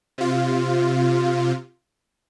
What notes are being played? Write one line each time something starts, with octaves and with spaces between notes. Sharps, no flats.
C3 F4